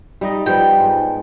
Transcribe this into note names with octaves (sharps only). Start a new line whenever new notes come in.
G3 D#4 D#5
F3 G3 B3 G5
G#2